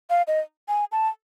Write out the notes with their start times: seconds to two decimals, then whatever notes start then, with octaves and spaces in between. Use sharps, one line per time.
0.10 F5
0.27 D#5
0.68 G#5
0.92 A5